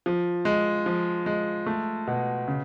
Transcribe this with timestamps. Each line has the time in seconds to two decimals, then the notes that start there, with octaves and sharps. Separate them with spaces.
0.06 F3
0.45 G#3
0.86 F3
1.26 G#3
1.66 A3
2.07 B2
2.48 C#3